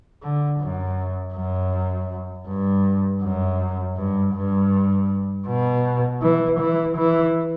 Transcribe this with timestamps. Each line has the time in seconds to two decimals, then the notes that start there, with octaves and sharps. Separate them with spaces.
0.23 D3
0.60 F#2
1.35 F#2
2.47 G2
3.23 F#2
3.97 G2
4.35 G2
5.47 B2
6.22 E3
6.60 E3
6.97 E3